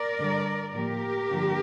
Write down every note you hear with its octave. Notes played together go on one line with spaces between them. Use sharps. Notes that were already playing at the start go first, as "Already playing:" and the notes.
Already playing: A#4 D5
G2 D3 G3
A2 F3 A#3 G4 A#4
G2 D3 F3 A#3 D4